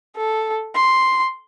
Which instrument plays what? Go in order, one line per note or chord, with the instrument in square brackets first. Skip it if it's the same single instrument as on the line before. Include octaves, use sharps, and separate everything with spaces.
[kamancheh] A4
C6